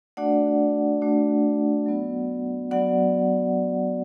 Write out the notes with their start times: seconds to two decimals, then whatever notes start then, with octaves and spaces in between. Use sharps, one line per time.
0.17 A3 D4 F#4 D5 F#5
1.01 A3 D4 F#4
1.86 F#3 B3 F#4
2.71 F#3 B3 F#4 D5 F#5